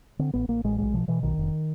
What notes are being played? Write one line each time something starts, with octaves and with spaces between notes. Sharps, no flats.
D3 C4
A1 B3
A1 A#3
A1 G#3
B1 G#3
B2 F3
B2 E3
B1 D#3
F1